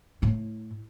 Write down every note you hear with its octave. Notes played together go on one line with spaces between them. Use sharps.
A2 E4